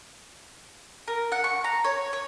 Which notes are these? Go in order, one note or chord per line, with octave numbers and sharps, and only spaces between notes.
A#4
F#5
C#6
A#5
C#5
C#5